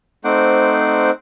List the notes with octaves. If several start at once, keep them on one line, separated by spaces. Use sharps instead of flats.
A3 C4 D#4 C5 F#5 D6